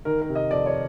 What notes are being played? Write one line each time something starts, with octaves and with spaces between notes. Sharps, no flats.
D#3 A#4
A#4
C3
D#5
F2 D5
C#5